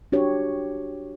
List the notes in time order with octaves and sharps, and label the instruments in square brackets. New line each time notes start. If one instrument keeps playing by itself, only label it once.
[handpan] D4 F#4 G4 C#5